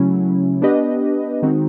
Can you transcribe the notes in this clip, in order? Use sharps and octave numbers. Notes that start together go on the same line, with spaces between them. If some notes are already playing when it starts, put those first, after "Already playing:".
Already playing: C#3 F#3 A3 C#4 E4
B3 D4 G4 B4 D#5
D#3 G#3 C4 D#4 F#4